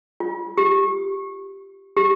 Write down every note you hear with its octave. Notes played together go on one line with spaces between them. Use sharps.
F4
G4
G4